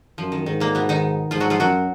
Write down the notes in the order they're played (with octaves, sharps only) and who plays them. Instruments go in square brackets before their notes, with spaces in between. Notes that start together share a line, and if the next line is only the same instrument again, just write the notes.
[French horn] F#2 [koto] F3
[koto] D#3
[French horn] G#2 [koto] D#3
[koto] A#2 A#3
B2 B3
D#3 D#4
[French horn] G#2 [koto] F3 F4
[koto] F#3 F#4
F3 F4
[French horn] F#2 [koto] F#3 F#4